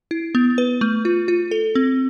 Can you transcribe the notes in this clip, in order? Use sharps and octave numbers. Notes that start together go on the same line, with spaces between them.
E4
B3
B4
A3
F4
F4
A4
C4